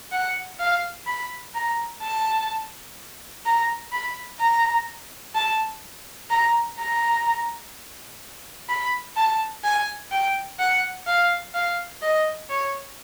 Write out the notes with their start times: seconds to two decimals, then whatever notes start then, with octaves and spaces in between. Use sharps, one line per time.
0.12 F#5
0.60 F5
1.07 B5
1.54 A#5
2.02 A5
3.45 A#5
3.92 B5
4.40 A#5
5.35 A5
6.30 A#5
6.79 A#5
8.69 B5
9.17 A5
9.64 G#5
10.12 G5
10.59 F#5
11.07 F5
11.54 F5
12.02 D#5
12.50 C#5